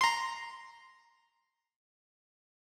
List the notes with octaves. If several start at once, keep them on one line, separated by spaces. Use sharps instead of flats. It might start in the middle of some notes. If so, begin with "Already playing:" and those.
A#5 C6